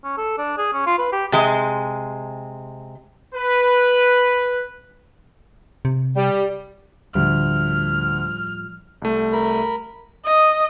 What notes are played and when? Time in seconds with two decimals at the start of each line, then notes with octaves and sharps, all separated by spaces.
0.04 C#4
0.18 A4
0.38 D4
0.58 G#4
0.73 C#4
0.87 F4
0.99 B4
1.13 G4
1.32 C3 G#3
3.35 B4
5.85 C3
6.15 G3
7.15 D2 A2 F3 G3 F6
9.02 C2 A3
9.33 A#4 B5
10.25 D#5